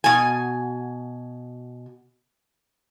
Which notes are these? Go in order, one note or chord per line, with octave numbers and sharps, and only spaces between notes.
B2 G#5